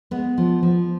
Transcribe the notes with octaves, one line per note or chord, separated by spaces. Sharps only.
G#3 B3
F3
F3